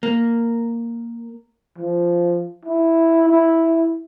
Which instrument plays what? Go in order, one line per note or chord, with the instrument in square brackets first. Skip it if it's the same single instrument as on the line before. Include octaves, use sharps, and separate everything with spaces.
[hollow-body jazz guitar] A#3
[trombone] F3
E4
E4